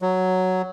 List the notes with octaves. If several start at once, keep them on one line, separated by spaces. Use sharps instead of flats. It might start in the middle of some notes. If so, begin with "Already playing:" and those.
F#3